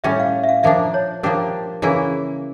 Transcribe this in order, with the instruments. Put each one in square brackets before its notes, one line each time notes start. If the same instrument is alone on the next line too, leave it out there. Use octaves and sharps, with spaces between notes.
[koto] A2 G3 C#4 [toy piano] E5
[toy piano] F5
E5
F5
[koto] A#2 F3 A#3 D4 [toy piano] E5
[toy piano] C#5
[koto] F3 A#3 D4 G4 [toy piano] A#4
[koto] C#3 E3 A#3 E4